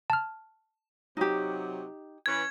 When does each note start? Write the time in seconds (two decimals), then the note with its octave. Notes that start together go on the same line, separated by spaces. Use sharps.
0.10 A5 F6
1.17 C3 F#3 D#4 G4
2.26 E3 C#4 B4 G#6